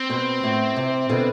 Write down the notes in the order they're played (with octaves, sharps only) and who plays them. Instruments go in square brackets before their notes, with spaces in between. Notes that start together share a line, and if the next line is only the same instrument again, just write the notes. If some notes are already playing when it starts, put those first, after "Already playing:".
Already playing: [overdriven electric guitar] C4
[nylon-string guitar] B2
A2
C3
B2 D3